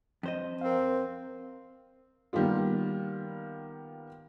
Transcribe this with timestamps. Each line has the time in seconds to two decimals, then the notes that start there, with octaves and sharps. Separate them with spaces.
0.23 F2 C5 D#5
0.61 C4 A#4 F5
2.33 D#3 G3 A#3 B3 F4